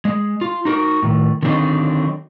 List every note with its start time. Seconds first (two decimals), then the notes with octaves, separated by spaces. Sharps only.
0.05 G#3
0.41 F4
0.65 D#4 F#4 A#4
1.03 A2 D#3
1.43 D3 D#3 F#3 C4 D4 D#4